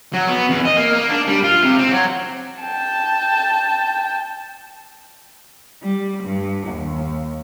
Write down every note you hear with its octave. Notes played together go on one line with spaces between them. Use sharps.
F#3
B3
E2
D#5
A#3
A#3
D4
G3
F4
C3
C4
F#3
G5 A5
G3
G2
D#2